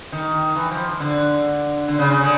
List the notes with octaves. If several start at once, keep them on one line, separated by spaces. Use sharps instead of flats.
D#3
E3
F3
D3
D3
C#3
C#3
D3